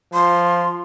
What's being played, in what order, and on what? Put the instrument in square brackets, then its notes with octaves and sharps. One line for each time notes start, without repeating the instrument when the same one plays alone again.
[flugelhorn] F3 [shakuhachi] C6